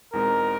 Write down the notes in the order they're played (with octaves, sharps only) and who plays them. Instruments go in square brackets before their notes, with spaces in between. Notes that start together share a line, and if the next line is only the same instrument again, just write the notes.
[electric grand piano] E2 B2 G#3 C4 D#4 [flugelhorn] A#4